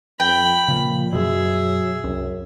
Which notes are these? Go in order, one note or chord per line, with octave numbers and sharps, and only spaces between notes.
F2 G5 B5
A#2 C#3 F3
F#2 B2 F#3 G#4 E5
C2 F#2